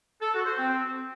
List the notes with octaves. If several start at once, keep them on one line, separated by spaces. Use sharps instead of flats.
A4
F#4
C5
C4